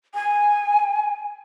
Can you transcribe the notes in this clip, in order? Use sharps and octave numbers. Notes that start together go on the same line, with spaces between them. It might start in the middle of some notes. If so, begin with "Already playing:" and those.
G#5